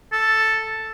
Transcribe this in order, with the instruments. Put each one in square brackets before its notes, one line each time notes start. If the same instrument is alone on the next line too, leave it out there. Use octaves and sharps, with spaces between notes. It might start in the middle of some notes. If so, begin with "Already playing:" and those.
[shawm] A4